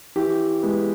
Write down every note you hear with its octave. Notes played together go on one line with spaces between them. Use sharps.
E3 G4
G#3 B3